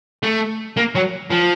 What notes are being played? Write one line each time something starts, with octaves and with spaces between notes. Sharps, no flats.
A3
A#3
F#3
F3